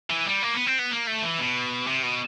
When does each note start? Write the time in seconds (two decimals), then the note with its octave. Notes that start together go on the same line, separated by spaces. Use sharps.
0.10 E3
0.26 G3
0.43 A#3
0.54 B3
0.66 C4
0.79 B3
0.91 A#3
1.07 A3
1.23 E3
1.39 B2
1.87 C3
2.03 B2